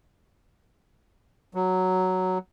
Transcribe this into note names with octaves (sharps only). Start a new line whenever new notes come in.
F#3